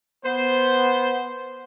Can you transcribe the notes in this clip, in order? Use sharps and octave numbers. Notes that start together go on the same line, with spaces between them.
B3 C5